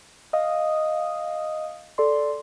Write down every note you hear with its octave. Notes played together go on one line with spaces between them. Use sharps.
D#5 F5 D#6
A4 D5 C6